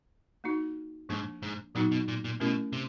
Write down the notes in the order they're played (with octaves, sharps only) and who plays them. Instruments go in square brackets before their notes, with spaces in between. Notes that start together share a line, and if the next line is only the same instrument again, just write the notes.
[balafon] A#3 D#4 F#4
[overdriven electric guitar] G#2 [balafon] F3 A#3 D4
[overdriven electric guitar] G#2
[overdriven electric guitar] A#2 [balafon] F#3 B3 D#4 F#4
[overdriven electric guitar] B2
A#2
A#2
[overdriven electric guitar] B2 [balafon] A3 C#4 E4 G4 A#4
[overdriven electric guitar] C3